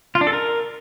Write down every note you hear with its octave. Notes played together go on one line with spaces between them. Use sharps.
F4
D4
A4
A#4